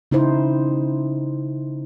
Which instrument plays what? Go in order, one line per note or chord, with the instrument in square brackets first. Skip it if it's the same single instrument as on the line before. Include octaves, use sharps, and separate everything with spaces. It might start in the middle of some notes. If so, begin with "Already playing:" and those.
[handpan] C#3 D#4 E4 C5